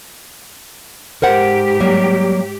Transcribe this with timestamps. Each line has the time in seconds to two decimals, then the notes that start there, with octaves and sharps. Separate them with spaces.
1.22 G#2 G4 A#4 C5 F#5
1.80 F#3 G3 A#3